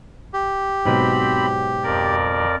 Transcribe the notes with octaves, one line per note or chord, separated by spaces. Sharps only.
G4
G#2 B2 F#3 C4 B5
F2 A#4 D5